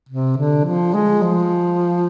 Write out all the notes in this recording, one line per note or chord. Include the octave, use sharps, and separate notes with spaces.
C3
D3
F3
G#3
F3